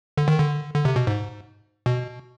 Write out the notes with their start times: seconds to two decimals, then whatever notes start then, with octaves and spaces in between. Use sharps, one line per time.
0.18 D3
0.28 D#3
0.39 D3
0.75 D3
0.85 C3
0.96 B2
1.07 G#2
1.86 B2